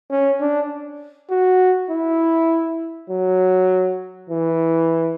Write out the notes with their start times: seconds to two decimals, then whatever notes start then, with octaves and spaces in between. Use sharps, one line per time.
0.11 C#4
0.41 D4
1.31 F#4
1.91 E4
3.10 F#3
4.30 E3